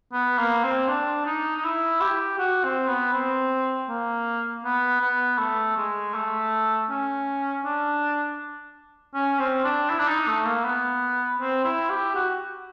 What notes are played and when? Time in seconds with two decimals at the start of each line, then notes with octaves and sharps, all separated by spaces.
0.13 B3
0.38 A#3
0.64 C4
0.88 D4
1.26 D#4
1.56 D#4
1.64 E4
2.01 G4
2.38 F#4
2.64 C4
2.88 B3
3.13 C4
3.89 A#3
4.64 B3
5.01 B3
5.38 A3
5.77 G#3
6.14 A3
6.89 C#4
7.64 D4
9.14 C#4
9.39 C4
9.64 D4
9.90 E4
9.99 D4
10.08 D#4
10.27 A3
10.45 A#3
10.64 B3
11.40 C4
11.64 E4
11.90 G4
12.15 F#4